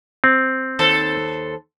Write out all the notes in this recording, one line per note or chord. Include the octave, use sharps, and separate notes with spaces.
C4
D#2 A4 C5